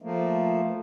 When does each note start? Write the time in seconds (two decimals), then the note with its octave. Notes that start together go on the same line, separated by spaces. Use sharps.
0.02 F3 A3 A#3